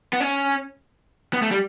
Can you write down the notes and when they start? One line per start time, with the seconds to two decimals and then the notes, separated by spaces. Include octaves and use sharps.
0.13 B3
0.20 C#4
1.33 B3
1.42 A3
1.51 G3